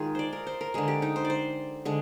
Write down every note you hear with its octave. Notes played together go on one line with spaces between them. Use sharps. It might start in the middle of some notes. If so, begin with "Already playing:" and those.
Already playing: D#3 G#3 D#4 F4 G#4
C5 D5
A#4
C5
A#4
D3 G#3 G#4
G4
D#4
C5
D5
C5
D3 G#3